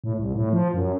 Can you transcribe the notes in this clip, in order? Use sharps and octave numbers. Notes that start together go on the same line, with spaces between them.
A2
C2
A2
F3
F#2